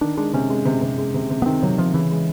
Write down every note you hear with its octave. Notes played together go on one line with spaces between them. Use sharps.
D#3 D4
G#3 D4
C3 C#4
G#3
C3
C3
G#3
C3
C3
B3
D#3 C4
C3 F#3
C3 F3
C#3 E3
G#3